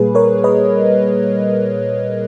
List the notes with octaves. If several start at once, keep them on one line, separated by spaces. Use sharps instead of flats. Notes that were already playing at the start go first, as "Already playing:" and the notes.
Already playing: A#2 G3 A#3 G#4 B4
A#4 C#5
B4 D#5